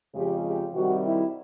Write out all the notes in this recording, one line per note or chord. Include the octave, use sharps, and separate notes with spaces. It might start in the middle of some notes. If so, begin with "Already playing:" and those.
F2 C#3 F3 G#3 G4
G4
C3 D#3 G3 F#4
E4